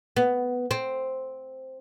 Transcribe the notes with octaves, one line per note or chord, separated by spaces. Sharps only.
B3
C4